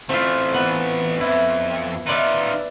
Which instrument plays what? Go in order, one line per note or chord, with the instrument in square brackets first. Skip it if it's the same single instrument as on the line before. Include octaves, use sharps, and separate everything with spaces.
[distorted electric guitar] E3 A3 [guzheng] C4 F4
[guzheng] B3
[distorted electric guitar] F2 [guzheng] E4
[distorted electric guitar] D#4 F4 [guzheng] B4 D5 E5